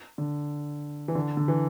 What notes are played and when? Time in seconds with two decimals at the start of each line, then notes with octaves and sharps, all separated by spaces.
0.18 D3
1.08 E3
1.15 D3
1.37 D3
1.48 E3